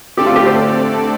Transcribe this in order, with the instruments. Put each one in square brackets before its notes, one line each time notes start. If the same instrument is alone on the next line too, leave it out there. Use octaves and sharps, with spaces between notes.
[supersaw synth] D3 A3 C4 A4 D5 [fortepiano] G4
[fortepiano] F4
G4
C5